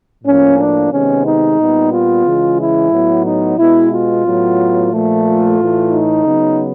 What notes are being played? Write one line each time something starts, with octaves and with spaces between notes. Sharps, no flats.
A2 F3 A#3 C#4
D4
C3 D#3 G#3 B3 C#4
D#4
A#2 G3 B3
F4
C#3 E3 G#3
E4
A2 F#3 B3
D#4
B2 G#3 B3 E4
F4
A2 F#3 B3
A#2 F3 A3
F4
A2 E3 A3
D#4
C#3 F#3 B3